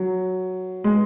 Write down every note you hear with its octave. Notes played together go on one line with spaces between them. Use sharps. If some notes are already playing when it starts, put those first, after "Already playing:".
Already playing: F#3
G#3